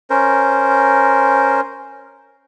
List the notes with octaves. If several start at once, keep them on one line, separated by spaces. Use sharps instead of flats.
C#4 A#4 C5